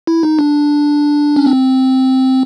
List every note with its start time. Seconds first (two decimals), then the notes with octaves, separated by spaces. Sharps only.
0.07 E4
0.23 D#4
0.39 D4
1.36 C#4
1.46 C4